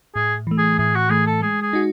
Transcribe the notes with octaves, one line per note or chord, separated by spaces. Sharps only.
A2 G#4
E3 A3
G#4
A2 G#4
F#4
E3 A3 G#4
A4
G#3 G#4
G#4
D#4 F#4